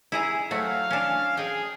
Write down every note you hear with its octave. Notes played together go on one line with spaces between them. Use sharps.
E4 G#4 A#5
F#3 A3 F#4 F5
C#4 D4
G#4 D#5 G5